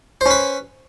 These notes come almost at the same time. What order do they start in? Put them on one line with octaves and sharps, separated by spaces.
C5 C#4 B4